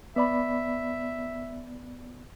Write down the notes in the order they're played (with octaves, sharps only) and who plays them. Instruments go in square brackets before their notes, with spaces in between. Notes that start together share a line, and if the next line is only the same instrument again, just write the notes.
[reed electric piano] B3 D5 B5 [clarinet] E5